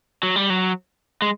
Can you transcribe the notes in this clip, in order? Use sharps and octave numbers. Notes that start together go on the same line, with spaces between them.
F#3
G3
F#3
G#3